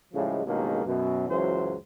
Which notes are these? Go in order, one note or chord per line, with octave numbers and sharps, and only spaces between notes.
A2 C#3 F3 G3 G#3
C#2 G2 B2 D#3 G#3 A#3
F#2 B2
C#2 F#2 E3 F#3 C5